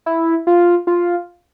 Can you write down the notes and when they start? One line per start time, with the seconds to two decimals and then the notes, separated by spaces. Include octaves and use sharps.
0.06 E4
0.47 F4
0.87 F4